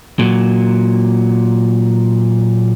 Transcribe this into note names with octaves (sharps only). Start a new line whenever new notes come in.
A#2 F#3